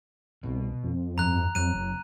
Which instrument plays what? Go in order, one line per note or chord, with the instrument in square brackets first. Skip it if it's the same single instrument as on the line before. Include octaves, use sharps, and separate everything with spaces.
[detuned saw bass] C2 [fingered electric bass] B2
[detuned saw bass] F2
[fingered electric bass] G2 F3 [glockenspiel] A#5 F#6
[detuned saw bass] F2 [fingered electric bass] F#3 [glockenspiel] F#6 D#7
[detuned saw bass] F#1